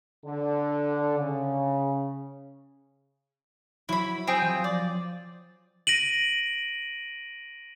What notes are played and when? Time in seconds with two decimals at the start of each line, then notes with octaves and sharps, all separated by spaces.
0.25 D3
1.19 C#3
3.89 F#3 E4 B5
4.27 C4 G#4 G5
4.41 F3
4.64 D5
5.87 A#6 D7 D#7 F#7